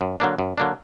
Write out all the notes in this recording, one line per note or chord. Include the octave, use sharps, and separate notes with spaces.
F#2
D3 F#3 A#3 D4
F#2
D3 F#3 A#3 D4